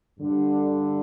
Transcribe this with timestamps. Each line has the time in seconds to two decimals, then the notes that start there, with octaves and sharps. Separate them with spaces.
0.19 G2 D3